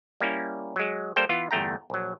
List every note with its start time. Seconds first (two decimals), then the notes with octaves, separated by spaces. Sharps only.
0.20 G3 A#3 C#4 E4
0.76 F#3 G#3
1.16 G3 A#3 A4 C5 G5
1.29 E3 B3 F4
1.51 G1 E2 A3 G5 A#5
1.90 A#1 F#3